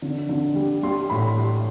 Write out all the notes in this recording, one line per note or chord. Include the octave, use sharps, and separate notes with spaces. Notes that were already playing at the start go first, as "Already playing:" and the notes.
D3
D3
G3
G3 C6
A2 B5
G3 C6